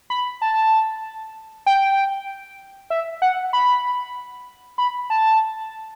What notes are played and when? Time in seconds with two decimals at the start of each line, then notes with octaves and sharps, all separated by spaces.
0.10 B5
0.42 A5
1.66 G5
2.90 E5
3.22 F#5
3.53 B5
4.78 B5
5.10 A5